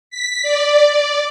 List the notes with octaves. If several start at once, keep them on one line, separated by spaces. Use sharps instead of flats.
B6
D5